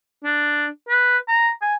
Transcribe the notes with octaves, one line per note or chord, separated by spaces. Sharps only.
D4
B4
A#5
G#5